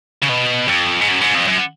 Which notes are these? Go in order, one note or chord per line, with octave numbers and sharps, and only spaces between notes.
C#3
B2
F2
G#2
F#2
G#2
F2
F#2